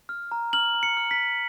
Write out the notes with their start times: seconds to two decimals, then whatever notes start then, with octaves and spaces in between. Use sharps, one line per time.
0.09 F6
0.32 A#5
0.53 F6 F#7
0.74 A#5
0.83 C#7
0.97 F6
1.11 B6
1.18 A#5